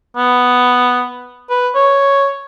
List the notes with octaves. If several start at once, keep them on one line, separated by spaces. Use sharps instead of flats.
B3
B4
C#5